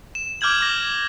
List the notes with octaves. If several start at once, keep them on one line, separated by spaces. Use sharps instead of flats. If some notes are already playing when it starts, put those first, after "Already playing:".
E7
D6 F6 G6 G#6 F#7
D6 A#6